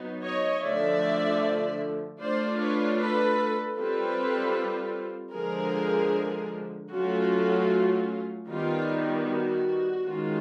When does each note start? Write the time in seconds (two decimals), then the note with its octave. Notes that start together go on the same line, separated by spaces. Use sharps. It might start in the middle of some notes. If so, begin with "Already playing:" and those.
Already playing: F#3 B3 D#4
0.23 C#5 D#5
0.63 D3 F3 A3 D5 E5
2.20 A3 D4 F4 C5 D5
2.59 B4 C#5
2.99 A4 B4
3.77 G3 C4 F4 A4 B4
5.34 D3 F3 G#3 G#4 A#4
6.92 F#3 A3 C#4 F4 F#4
8.49 D#3 G3 B3 F4
9.28 F#4
10.06 D#3 G#3 C#4 F4